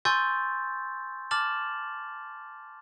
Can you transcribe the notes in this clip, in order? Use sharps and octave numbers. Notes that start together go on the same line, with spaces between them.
G#5 C6 C#6 E6 G6 A6
A5 D6 F6 A6 E7 F#7